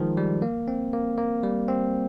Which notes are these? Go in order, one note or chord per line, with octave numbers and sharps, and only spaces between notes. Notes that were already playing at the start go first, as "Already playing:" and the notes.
Already playing: D#3 F3 G#3
G3
A#3
C4
A#3
A#3
G3
C4